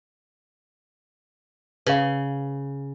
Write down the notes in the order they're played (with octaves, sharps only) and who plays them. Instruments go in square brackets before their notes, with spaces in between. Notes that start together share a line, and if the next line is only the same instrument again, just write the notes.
[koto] C#3 [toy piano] B4 F5